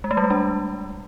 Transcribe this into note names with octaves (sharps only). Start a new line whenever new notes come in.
G#3
A3
G3
G#3
D4